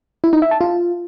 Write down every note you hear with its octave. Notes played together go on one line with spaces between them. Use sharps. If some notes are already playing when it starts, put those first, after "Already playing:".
E4
D#4
E5
A5
F4